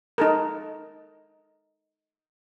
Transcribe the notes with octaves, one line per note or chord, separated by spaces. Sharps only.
D#4 A4 A#4